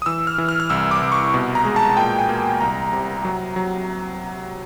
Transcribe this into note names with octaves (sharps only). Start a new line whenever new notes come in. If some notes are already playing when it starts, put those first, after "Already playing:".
D#6
E3 E6
F6
E3
F6
F6
C2 E6
D6
C2
C#6
B2
A#5
G#3
A5
A#2 G5
G#5
A#3
C2 A#5
C3
F#3
F#3